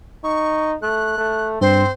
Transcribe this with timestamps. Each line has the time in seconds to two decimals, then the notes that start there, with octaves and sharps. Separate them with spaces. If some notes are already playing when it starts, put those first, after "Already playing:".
0.24 D#4 C#6
0.82 A3 F#6
1.18 A3
1.61 G2 C4 C5